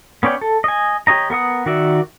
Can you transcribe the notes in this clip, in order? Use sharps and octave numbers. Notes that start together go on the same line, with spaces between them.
B3 C#4 C#5 D5 G5
A4
D#5 G#5
G4 C#5 D#5 A#5
B3 A#4 F#5 D#6
D#3 F#4 D5 E5